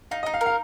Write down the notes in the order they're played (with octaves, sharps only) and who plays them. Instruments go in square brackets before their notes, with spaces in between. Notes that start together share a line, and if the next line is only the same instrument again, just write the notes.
[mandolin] D#4 [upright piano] F5
[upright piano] D#5
[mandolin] D#4
[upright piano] F5
[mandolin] A#4
[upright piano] F5